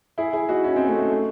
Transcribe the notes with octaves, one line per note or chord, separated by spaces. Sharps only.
E4 G#4
E4 G#4
D#4 F#4
C#4 E4
C4 D#4
A3 C#4
A3
A3